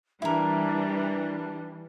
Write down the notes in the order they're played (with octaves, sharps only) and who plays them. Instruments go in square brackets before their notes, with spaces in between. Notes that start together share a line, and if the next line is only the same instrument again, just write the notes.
[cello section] E3 [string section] G3 [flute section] D4 [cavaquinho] E4 A#4